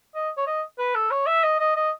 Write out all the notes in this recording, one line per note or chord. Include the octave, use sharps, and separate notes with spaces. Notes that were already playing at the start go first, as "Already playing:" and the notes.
D#5
C#5
D#5
B4
A4
C#5
E5
D#5
D#5
D#5